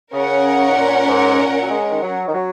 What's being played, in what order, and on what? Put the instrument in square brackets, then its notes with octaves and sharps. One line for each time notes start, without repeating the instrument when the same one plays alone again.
[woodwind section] C#3 [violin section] C#4 A#4 F#5
[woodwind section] G#2
A#2
G#2
A#2
F#3
G#3
D#3
F#3
D#3
F#3